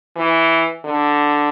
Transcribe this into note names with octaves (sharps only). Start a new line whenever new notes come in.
E3
D3